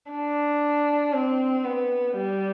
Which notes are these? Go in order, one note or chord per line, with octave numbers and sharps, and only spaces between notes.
D4
C4
B3
G3